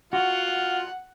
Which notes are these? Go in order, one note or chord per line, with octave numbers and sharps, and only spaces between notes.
F4 F#4 F#5